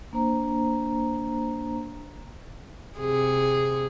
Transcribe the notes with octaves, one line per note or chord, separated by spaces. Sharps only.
A#3 D4 C5 A#5
C3 G#4